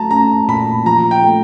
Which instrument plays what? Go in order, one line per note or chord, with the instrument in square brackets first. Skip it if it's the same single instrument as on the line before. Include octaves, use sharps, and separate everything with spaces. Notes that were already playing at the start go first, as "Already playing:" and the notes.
Already playing: [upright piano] F#3 A3 [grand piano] A5 A#5
[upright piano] C#4 [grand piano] A#5
[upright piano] A#2 [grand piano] B5
[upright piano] F3 [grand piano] A#5
[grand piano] G5
[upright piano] A3